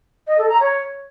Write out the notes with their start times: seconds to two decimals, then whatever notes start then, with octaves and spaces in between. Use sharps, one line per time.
0.27 D#5
0.38 A4
0.49 A#5
0.60 C#5